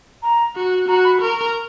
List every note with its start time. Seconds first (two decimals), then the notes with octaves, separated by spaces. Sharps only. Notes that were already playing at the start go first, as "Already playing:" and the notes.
0.22 A#5
0.55 F#4
0.88 F#4 A#5
1.04 B5
1.21 A#4 C#6